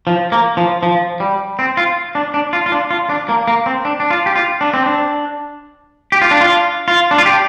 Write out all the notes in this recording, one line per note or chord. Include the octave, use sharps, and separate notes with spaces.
F3
A#3
F3
F3
G3
C4
F4
D4
D4
F4
F4
D4
F4
D4
A#3
A#3
C4
D4
D4
F4
G4
F4
D4
C4
D4
G4
F4
D4
F4
F4
D4
F4
G4